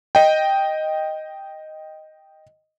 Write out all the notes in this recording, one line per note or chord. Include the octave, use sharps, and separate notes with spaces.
D#5 G5